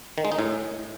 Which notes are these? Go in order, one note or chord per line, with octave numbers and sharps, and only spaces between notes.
D#3
G#3
D#4
A2